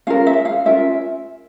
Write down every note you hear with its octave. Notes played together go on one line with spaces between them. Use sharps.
C#4 F4 A#4 F5
E5
F5
C#4 F4 A#4 E5